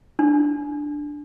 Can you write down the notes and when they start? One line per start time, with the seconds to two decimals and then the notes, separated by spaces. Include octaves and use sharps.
0.19 D4